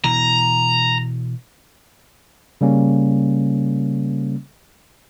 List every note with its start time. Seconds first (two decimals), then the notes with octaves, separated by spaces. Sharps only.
0.04 B2 E3 A#5
2.61 C#3 G3 A#3 C#4